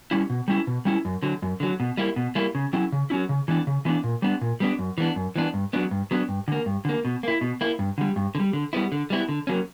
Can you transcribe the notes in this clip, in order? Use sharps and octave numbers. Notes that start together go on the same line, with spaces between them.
G3 C#4 E4
B2
G3 C#4 E4
B2
G3 C#4 E4
F#2
D3 F#3
F#2
D3 F#3
B2
G3 A#3 E4
B2
G3 A#3 E4
C#3
F#3 C#4 E4
C#3
F#3 C#4 E4
C#3
E3 B3 D4
C#3
E3 B3 D4
A#2
G3 B3 D4
A#2
G3 B3 D4
F#2
E3 B3 D4
F#2
E3 B3 D4
G2
F#3 B3 D4
G2
F#3 B3 D4
G2
D3 A#3
G2
D3 A#3
B2
A#3 E4
B2
A#3 E4
G2
D3 G3
G2
D3
G3
D3
G3 B3 E4
D3
G3 B3 E4
D3
F#3 A#3 C#4